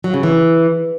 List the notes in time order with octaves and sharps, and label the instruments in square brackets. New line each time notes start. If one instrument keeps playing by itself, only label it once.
[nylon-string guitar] F#3
C#3
E3